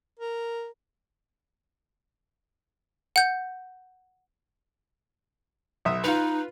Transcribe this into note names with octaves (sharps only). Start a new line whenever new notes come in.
A#4
F#5 G6
B1 E5 D#6
D#4 F4 B4